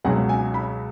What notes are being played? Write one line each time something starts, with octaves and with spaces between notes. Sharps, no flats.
C#2 B2 F#3 F#5
G#5
B5